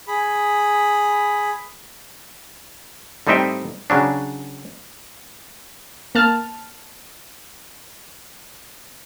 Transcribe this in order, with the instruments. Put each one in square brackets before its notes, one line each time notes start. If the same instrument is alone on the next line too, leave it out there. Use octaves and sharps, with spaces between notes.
[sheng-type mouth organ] G#4 B5
[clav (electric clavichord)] A2 G3 C4 D#4 E5 G5
C#3 F#3 D4
[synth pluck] A#3 A5 F6